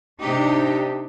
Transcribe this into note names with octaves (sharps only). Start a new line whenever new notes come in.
C3 D4 D#4 G4